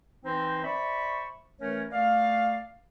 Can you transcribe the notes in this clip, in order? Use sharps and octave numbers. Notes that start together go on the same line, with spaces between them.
E3 C4 D#4 C5
C5 D5 E5 B5 C#6
E3 A3 C#4 A#4 C#5
A3 D5 F5